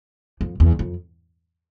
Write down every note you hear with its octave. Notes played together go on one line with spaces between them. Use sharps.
F2
E2
F2